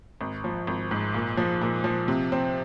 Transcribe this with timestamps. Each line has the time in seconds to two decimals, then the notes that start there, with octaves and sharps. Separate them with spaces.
0.21 G#1
0.44 F3
0.67 G#1
0.91 G#2
1.14 A#2
1.37 F3
1.61 A#2
1.84 F3
2.08 C3
2.32 C4